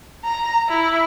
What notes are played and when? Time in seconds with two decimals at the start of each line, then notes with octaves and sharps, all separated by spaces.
0.24 A#5
0.69 E4